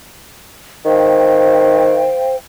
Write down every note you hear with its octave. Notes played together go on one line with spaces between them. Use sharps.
D#3 C5 F5 G5